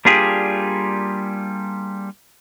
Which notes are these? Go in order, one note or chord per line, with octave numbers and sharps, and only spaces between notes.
G3 A#3 D4 F4 G4 G#4